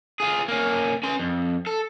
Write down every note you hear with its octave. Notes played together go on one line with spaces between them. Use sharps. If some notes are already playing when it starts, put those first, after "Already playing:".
F4 G#4
A#3 C#4
C#4 C6
F2
A4